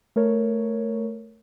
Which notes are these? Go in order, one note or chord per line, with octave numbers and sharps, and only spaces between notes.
A3 A#4 C#5